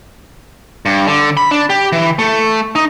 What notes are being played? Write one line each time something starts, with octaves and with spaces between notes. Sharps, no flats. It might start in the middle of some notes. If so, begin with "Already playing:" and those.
G2
D3
B5
D4
G4
E3
A3
D#4